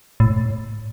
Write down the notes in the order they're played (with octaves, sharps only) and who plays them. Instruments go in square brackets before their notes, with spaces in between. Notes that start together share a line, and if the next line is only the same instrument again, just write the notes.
[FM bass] A2